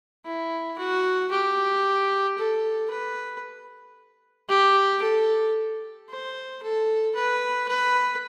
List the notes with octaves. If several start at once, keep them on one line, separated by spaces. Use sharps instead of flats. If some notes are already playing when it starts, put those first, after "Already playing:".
E4
F#4
G4
A4
B4
G4
A4
C5
A4
B4
B4